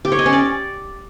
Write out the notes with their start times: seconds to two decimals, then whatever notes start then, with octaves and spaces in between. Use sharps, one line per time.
0.05 G4
0.12 C#5
0.19 D#5
0.26 C#4
0.33 D5